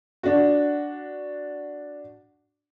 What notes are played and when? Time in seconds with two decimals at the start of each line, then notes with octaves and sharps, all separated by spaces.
0.23 D4 F#4